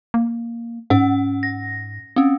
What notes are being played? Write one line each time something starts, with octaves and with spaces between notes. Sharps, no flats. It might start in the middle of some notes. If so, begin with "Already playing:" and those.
A#3
G#2 C#4 F#5
A#6
C4 C#4